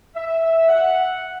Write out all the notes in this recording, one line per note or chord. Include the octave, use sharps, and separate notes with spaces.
E5
F#5